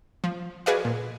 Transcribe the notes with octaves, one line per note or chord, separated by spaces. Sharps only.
F3
F#4 G#4 B4 D5 D#5 F5
A#2